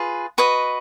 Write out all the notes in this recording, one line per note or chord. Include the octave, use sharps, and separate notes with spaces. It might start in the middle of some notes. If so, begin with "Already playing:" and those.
Already playing: F4 G#4 B4
F#4 B4 D#5